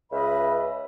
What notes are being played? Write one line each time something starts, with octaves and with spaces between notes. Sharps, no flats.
C#2 B4 D#5 E5 B5